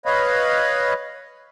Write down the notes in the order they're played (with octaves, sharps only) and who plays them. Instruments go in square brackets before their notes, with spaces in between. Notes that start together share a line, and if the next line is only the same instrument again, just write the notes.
[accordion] B4 C#5 D#5 F5 B5